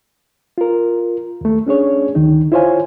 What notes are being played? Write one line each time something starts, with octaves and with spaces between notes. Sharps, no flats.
F4 A#4
D#2 A3
C#4 D4 G#4 C#5
D2 D#3 D#4
E4 F4 C5 C#5 F5 G#5